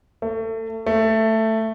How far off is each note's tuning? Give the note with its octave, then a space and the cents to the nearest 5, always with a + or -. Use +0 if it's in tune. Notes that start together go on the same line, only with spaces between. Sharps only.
A3 +30
A3 +10